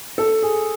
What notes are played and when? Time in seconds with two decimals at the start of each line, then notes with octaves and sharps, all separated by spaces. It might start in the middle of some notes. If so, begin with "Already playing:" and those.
0.18 A4
0.42 G#4